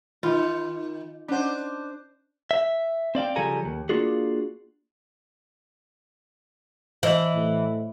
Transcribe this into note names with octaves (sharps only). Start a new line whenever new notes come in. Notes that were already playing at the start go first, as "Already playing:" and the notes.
D#3 F4
C#4 D4 C5 F#5
E5
C4 D5 F5 G5
C#3 F3 G3 A4 G#5 A#5
D#2
A#3 D4 F4 F#4 G#4
E3 C5 D#5 F#7
A2